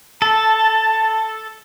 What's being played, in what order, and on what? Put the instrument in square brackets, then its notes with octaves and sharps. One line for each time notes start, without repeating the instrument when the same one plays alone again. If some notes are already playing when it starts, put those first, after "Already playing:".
[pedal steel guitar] A4 [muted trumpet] A5